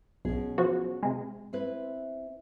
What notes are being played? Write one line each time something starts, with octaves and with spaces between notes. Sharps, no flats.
B1 B2 C#4 G#4
F3 F#3 F#4
C3 G#3
C4 E4 B4